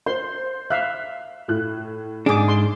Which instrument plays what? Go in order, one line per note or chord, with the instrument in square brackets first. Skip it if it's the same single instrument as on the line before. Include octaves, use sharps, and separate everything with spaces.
[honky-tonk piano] C5 [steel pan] C6
[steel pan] E5 F5 [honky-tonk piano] F#6
[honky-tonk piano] A2 F#6
[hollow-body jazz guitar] G#2 D4 [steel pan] G#4 D6
[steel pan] C6